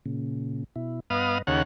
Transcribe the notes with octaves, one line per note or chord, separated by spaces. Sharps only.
A#2 C#3
B2 E4
G2 B3 B4 D#5 F5 D#6
D#2 C#3 F#5 A5